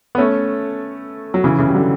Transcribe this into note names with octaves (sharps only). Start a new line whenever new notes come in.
B3
A3 C#4
F#3
C#3 E3
C#3 E3
G3
D3 F#3